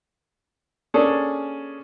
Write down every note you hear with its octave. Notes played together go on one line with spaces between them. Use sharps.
A#3 C#4 D4 G#4 A4